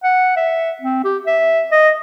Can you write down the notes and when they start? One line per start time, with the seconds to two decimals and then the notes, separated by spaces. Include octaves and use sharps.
0.04 F#5
0.36 E5
0.82 C4
1.04 G4
1.27 E5
1.72 D#5